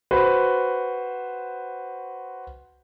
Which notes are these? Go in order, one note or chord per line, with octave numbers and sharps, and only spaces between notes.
F#4 B4 C5